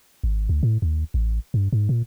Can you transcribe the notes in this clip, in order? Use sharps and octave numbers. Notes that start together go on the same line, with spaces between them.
G#1
D2
A2
D#2
A1
G2
G#2
A#2